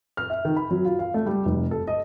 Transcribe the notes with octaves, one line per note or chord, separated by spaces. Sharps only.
F6
E5
D#3
B5
F#3
F4
F5
A3
G3
F1
A4
D#5